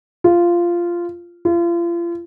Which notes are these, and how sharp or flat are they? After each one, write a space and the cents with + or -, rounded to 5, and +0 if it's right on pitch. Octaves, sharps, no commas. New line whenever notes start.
F4 -10
F4 -35